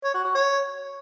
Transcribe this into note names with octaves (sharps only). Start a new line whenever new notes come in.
C#5
F#4
F#4
C#5